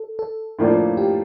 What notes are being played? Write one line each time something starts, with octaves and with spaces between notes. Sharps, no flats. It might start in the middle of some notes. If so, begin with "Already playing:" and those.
Already playing: A4
A4
A2 F3 A#3 D4 F4
G4